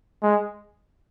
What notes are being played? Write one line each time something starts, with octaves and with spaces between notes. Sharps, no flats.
G#3